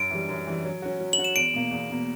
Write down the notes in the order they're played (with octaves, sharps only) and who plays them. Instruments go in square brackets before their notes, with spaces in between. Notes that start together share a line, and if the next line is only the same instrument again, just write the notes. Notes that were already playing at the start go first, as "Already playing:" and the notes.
Already playing: [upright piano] F#2 [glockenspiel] D7
[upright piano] E3 G3
F#2
E3 G3
F#3
C#4 F#4
F#3
[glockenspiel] F#7
[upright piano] C#4 F#4
[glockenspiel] E7
[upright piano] E2 [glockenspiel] D7
[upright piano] B2 A#3
E2
B2 A#3